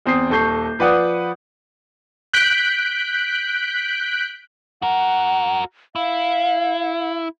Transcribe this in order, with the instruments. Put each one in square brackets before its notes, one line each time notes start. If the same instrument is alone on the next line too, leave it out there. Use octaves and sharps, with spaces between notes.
[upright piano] E2 C4 D#6 C7
D#1 A4 C#6 G6 C7
F3 B4 D5 F#5 D#6
[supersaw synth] F#6 G6 B6 D7
[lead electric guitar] F#4 A#4 [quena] F#5
[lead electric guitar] E4 [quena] F5